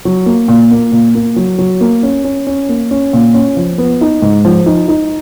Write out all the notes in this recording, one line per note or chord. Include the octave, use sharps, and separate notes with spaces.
F#3
A#3
A#2
A#3
A#2
A#3
F#3
F#3
A#3
C#4
C#4
C#4
A#3
C#4
A#2
C#4
F3
B3
D#4
G#2
F3
D#4
D#4